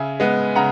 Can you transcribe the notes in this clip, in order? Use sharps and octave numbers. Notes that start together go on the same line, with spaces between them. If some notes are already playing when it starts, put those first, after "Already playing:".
Already playing: C#3 E5 G#5
G#3 B3
C#3 F#5 A#5